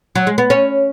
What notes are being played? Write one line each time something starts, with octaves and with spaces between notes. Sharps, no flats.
F#3
G#3
B3
C#4